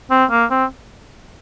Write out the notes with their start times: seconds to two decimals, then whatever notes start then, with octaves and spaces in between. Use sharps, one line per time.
0.11 C4
0.31 A#3
0.51 C4